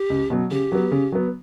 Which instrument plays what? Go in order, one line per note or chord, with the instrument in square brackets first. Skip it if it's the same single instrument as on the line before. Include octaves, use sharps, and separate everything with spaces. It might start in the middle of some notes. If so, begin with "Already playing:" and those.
Already playing: [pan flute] G4
[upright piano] C#2
B2 F#3
[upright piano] C#3 [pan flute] G4
[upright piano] F#3 B3
C#3
F#3 B3